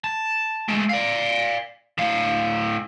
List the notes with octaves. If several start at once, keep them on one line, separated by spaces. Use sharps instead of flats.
A5
G#3 A3
D5 F5
A2 F5